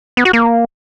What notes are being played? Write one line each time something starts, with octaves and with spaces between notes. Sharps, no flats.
B3
F#4
A#3